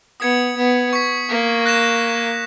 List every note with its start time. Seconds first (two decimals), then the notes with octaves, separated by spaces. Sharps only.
0.20 B3 D#6 G#6 C#7
0.57 B3
0.93 C#6 G#6 B6
1.29 A#3
1.66 F#6 A#6 E7